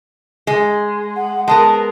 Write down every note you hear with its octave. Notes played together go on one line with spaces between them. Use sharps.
G#3
F#5
G#3 B3 A#4 A5